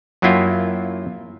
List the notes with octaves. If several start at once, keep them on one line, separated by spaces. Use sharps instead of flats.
F#2 F#3 A#3 E4 F4 G5